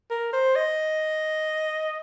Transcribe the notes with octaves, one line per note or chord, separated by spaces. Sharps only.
A#4
C5
D#5